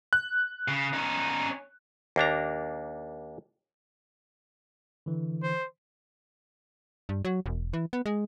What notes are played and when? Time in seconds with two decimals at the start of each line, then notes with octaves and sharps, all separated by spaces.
0.13 F#6
0.68 C#3
0.93 C#4 D#4
2.16 D#2 A#3 D4 A#5
5.06 D3 E3
5.42 C5
7.09 G2
7.25 F#3
7.46 E1
7.73 E3
7.93 B3
8.06 G#3